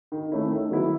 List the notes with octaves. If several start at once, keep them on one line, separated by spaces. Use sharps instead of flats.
D#3
A3 C#4 E4
D#3
F#3 B3 E4